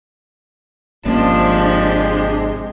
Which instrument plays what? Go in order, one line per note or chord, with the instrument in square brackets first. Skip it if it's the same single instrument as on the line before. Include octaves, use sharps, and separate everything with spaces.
[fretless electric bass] G#1 A#3 C#4 [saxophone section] C3 G#3 [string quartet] F3 [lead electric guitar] D4